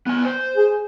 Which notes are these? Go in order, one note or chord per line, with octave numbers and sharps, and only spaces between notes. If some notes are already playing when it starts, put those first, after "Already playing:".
B3 G#5
C5
G#4